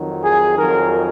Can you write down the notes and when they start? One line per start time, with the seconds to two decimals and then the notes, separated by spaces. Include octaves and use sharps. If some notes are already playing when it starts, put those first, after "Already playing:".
Already playing: F2 D#3 F#3
0.23 G#4
0.57 F2 D#3 F#3 A#4